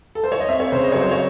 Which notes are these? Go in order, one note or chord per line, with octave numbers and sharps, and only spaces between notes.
A4
C5
C#5
D#5
C4 E5
C#5
C#3 C5
D#5
F#3 C#5
C5
C#5